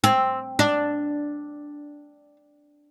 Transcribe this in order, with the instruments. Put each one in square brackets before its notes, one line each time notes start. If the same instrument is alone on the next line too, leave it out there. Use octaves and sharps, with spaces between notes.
[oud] C4
D4